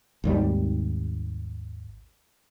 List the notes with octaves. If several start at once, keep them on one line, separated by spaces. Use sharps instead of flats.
G#1 D#2 G3